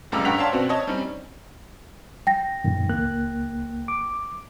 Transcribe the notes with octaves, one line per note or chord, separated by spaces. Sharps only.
F1 C#2 G3 A#5 D6 E6
G2 F#5 G5 A#5 B6 F7
C#5 D5 F5 G5 A5 C6
B2 C4 F#4
C#5 D#5 A5
G3 C4 C#4 D#4
G5 A#6
F#2 A#2 D#3
C#2 A#3 F#6
D6